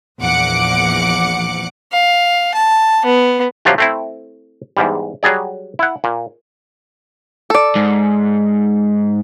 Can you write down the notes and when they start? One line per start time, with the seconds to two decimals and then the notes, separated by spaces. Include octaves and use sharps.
0.20 A#1 E2 F3 F#5 D6 C#7
1.92 F5
2.54 A5
3.05 B3
3.65 C3 F3 F#3 F4 G4
3.78 A3 C4 E4
4.77 E2 G#2 G3
5.23 F#3 G3 G#4 D5
5.79 E4 F#5
6.04 A#2
7.50 A4 D5
7.76 G#2